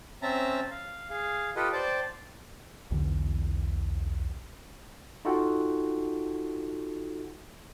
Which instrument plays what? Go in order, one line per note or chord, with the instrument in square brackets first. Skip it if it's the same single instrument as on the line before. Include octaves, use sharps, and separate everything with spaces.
[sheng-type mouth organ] C4 C#4 E5 A5 A#5
F5
G#4 F5
F4 G4 A4 B4 D#5
C5 D5 G5 A5
[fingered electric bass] B1 E2 D3 E3
[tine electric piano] D#4 F4 F#4 A4 F#5 G5